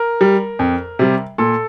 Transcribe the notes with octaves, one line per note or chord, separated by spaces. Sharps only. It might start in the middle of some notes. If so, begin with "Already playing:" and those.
Already playing: A#4
G3
F2
C3 G3
A#2 A4